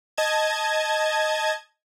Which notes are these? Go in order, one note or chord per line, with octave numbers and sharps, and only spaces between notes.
D#5 A5 G#6